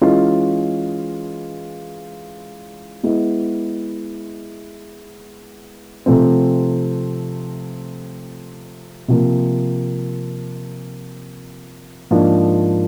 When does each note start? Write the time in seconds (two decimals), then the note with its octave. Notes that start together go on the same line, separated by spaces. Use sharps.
0.01 E3 G#3 C#4 F4
3.03 G#3 B3 E4
6.06 C3 F3 A3 C4
9.08 C3 F3 A#3
12.11 G#2 F3 A#3 D4 F4